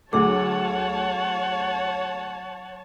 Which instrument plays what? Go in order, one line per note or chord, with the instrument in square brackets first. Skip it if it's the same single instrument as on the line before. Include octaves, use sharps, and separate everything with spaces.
[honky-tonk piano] D2 A3 [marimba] F#3 G#4 D6 [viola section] C#5 A5 [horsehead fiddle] F#5